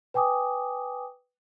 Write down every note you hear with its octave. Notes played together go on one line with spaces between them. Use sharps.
B4 G5 G#5 D6 D#6